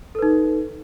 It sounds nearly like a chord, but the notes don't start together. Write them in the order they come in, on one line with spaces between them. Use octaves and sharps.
A4 B4 D#4